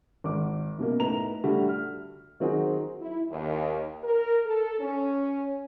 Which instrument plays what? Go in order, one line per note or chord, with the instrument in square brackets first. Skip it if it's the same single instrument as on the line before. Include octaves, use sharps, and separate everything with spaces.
[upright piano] G#1 D6
F#2 B2 F#3 A#3
A2 D#4 B4 A#5 F7
D3 G3 A3 F#4
F6
D#3 F#3 C4 D#4 F#4 G#4
[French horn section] E4
D#2
A#4
A4
C#4